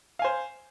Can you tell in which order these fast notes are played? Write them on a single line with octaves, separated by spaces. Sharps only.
F5 G#5 C5